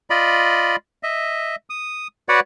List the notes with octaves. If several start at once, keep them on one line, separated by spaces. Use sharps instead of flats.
F4 D5 D#5 B5
D#5 E5
D#6
F#4 B4 C#5 D5 F#5